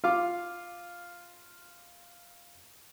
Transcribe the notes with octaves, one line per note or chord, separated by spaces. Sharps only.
F4 F5 D6